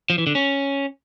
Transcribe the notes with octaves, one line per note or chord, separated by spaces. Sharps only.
F3
E3
D3
C#4